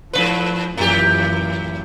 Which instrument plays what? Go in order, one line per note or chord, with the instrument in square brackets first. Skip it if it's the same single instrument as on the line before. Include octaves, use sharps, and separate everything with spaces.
[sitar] G#2 C#3 B4 [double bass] F3
[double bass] F#2 E3 [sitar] A2 G4